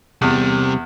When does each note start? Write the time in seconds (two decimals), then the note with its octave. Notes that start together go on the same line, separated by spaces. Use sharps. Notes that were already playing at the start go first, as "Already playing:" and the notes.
0.22 E2 C3 G3